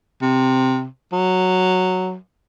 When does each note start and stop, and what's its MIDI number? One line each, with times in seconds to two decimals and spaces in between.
0.22 0.85 48
1.13 2.16 54